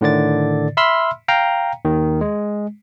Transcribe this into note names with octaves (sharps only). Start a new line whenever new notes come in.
A2 D3 D#3 D5 A6
E5 B5 C6 E6 F6
F5 G5 A#5
D#2 D#3
G#3